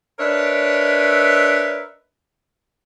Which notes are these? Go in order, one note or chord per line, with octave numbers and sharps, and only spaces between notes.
D4 A#4 B4 C#5 D#5 E5